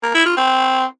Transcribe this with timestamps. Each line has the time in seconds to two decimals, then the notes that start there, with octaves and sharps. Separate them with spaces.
0.03 A#3
0.14 E4
0.26 F4
0.37 C4